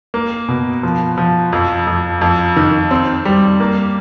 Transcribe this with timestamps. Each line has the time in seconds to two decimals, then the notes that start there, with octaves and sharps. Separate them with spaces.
0.14 A#3
0.48 B2
0.83 F3
1.18 F3
1.53 F2
1.87 F2
2.21 F2
2.56 D#3
2.91 C4
3.25 G3
3.60 A#3